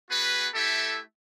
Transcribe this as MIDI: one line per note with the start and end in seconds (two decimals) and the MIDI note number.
0.11 0.48 59
0.11 0.48 66
0.11 0.48 68
0.11 0.48 71
0.54 1.02 57
0.54 1.02 64
0.54 1.02 67
0.54 1.02 69
0.54 1.02 76